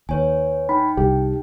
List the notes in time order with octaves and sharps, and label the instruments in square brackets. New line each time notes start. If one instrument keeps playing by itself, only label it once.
[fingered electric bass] D#2 [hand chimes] B4 C#5 G#5
[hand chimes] D#4 G5 [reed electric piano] B5
[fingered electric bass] C2 [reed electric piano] G4